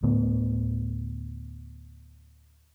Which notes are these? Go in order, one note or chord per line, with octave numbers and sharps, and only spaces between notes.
D2 A2 D3 B3